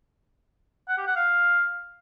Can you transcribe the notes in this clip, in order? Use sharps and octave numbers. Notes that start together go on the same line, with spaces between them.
F#5
G4
F#5
F5